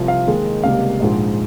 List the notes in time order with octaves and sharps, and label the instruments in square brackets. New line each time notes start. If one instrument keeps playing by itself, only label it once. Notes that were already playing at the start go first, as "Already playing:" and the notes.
Already playing: [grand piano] C2 C3 F3
F5
D#2 D#3 G#3
C#2 C3 G3 A#3 F5
A#1 G#2 F3 G#3